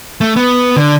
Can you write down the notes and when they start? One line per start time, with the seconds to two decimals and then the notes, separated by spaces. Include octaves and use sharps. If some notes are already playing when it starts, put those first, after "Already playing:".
0.21 A3
0.36 B3
0.76 D3